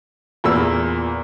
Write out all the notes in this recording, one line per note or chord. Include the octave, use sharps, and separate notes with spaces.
E2 A#2 E6